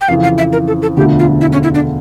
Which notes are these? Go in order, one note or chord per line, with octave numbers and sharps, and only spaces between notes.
G5
F2 C#3 E3 F5
F5
E5
A#4
A4
A4
E1 D2 D3 F3 A3 G4
F4
E4
C#4
E4
D4